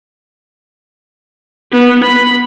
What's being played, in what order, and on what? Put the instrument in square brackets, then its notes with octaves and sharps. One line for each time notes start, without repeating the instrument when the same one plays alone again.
[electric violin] B3
B5